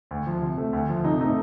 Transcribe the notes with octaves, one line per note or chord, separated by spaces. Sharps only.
D2
F3
C3
A3
D2
F3
C3 D#4
A3 D#4